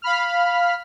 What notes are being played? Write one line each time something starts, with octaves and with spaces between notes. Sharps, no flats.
F5 B5 F6